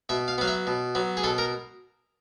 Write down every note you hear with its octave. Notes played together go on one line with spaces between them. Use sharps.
B2 E5
F5
F#3 B3 F5
E5
B2
F#3 B3
G#4
B2 A4
A#4